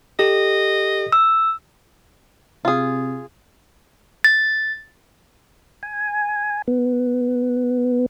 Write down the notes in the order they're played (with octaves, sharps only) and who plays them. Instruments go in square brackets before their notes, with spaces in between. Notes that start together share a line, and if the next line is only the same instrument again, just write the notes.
[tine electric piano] G4 A4 [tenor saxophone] D#5
[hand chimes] E6
[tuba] C3 [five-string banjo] F4 G#4
[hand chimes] A6
[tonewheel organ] G#5
B3